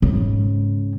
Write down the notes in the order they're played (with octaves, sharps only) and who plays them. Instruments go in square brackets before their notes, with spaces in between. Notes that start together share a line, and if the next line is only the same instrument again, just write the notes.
[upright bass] G#2 C#3